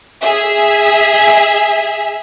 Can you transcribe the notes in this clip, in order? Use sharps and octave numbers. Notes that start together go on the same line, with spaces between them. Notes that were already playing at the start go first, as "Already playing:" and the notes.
G#4 E5